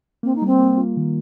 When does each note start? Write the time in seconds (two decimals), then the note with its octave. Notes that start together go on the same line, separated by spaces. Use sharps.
0.23 A#3 C4
0.35 D#4
0.42 G3 C4
0.59 A#3
0.78 F4
0.97 D#3